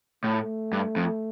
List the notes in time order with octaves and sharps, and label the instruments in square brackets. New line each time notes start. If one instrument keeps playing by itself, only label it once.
[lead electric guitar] A2 [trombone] A3
[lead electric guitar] G2
F2